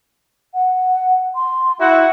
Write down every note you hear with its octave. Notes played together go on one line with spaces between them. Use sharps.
F#5
C6
E4 F#4 E5 F#5